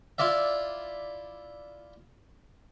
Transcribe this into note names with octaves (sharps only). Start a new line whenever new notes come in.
E4 F4 D5 E5